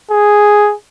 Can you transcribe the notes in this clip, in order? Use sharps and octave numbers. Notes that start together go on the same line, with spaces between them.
G#4